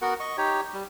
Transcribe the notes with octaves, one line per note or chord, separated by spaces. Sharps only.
B3 F#4 A#4 F#5
D#5 C#6
D#4 G4 C#5
G3